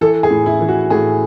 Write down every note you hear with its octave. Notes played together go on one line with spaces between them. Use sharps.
E3 A4
G#4
A2
E4
E3
F#4
A2 G#4